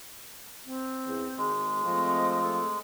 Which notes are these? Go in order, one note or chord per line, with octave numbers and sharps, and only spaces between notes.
C4
E2
G#1 G#3
F3 A3 C4 D#5
A4